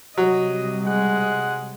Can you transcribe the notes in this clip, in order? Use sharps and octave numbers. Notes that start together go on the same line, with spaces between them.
C3 F#3 G3 D#5
G#3 F#5